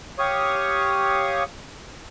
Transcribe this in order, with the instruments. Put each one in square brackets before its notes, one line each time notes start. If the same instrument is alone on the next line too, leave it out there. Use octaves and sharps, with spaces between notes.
[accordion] G4 C#5 F5 C#6 D#6